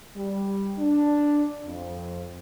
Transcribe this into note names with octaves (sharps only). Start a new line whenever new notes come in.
G3
D4
F2